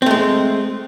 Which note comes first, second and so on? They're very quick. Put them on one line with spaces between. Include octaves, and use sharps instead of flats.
C4 A3 G#3